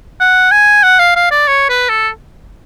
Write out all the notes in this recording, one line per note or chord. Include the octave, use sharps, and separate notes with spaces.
F#5
G#5
F#5
F5
F5
D5
C#5
B4
A4